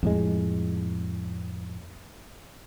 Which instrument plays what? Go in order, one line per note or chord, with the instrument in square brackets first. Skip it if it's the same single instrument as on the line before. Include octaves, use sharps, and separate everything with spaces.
[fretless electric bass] F2 A2 G#3